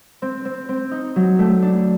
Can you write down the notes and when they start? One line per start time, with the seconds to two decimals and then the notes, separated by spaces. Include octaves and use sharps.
0.22 C4
0.45 C4
0.69 C4
0.91 D#4
1.16 F#3
1.39 A3
1.62 D4